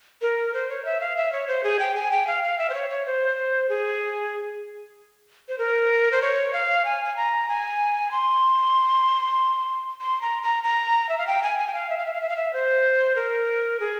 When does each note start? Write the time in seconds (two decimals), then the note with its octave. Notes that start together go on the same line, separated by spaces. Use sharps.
0.22 A#4
0.54 C5
0.69 C#5
0.85 E5
1.01 F5
1.17 E5
1.32 C#5
1.48 C5
1.64 G#4
1.79 G5
1.95 G#5
2.11 G5
2.27 F5
2.43 F5
2.59 E5
2.70 C5
2.74 C#5
2.90 C#5
3.06 C5
3.69 G#4
5.49 C5
5.58 A#4
6.12 C5
6.22 C#5
6.53 F5
6.85 G#5
7.05 G#5
7.16 A#5
7.49 G#5
8.11 C6
10.01 C6
10.21 A#5
10.43 A#5
10.64 A#5
11.09 E5
11.18 F5
11.27 G5
11.43 G#5
11.59 G#5
11.67 G5
11.74 F5
11.90 E5
11.98 F5
12.06 E5
12.14 F5
12.22 E5
12.29 F5
12.37 E5
12.53 C5
13.16 A#4
13.80 G#4